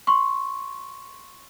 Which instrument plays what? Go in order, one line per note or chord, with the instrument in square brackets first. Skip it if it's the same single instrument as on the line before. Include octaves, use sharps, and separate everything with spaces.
[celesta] C6 C#6